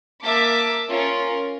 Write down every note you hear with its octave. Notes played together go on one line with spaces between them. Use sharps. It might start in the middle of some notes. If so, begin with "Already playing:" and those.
A#3 E5 A5 D6 B6
C#4 F4 A#4